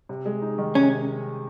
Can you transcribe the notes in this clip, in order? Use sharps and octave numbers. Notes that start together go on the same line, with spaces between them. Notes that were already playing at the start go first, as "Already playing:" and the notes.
C3
G#3
D#4
D#3
C3 C#4